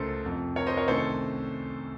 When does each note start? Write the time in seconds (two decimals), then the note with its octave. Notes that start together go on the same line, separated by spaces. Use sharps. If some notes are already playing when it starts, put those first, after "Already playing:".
Already playing: C#2 C#3 A3 A4 A#4 C5
0.24 F2 C3 F3
0.56 A#4 C#5
0.66 C5 D#5
0.77 A#4 C#5
0.88 C2 C3 D#3 A3 C#4 A4 C5